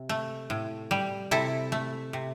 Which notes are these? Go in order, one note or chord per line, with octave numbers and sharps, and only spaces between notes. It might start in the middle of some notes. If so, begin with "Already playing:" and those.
Already playing: C3
A3
A2
G3
C3 E4 A4
A3
C3